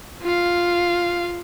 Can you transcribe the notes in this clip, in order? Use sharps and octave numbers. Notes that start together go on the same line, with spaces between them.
F4 F5